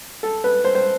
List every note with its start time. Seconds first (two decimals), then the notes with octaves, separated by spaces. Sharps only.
0.23 A4
0.44 B4
0.64 C5
0.75 C5